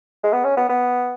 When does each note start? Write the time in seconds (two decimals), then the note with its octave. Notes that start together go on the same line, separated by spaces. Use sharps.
0.24 G#3
0.33 B3
0.44 C#4
0.57 B3
0.69 B3